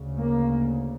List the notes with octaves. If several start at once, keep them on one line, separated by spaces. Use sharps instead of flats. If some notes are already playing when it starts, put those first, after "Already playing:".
Already playing: D2 C#3
A#3